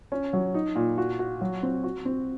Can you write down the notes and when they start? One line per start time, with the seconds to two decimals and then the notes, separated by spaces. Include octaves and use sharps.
0.12 C#4
0.33 F#3
0.54 D#4
0.75 A#2
0.98 F#4
1.19 F#4
1.41 F#3
1.63 C4
1.84 F#4
2.05 C4